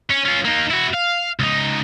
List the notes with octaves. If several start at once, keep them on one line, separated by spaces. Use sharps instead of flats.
C#4
C#4 F4
A#3 D#4
E4 F#4
F5
C#2 D#4